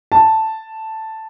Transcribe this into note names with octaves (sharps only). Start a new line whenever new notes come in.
A5